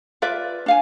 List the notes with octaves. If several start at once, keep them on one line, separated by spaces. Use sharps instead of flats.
F4 B4 D5 E5
D4 F5 G#5